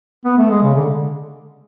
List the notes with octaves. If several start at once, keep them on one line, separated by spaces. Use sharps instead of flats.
B3
A3
G#3
C#3
D3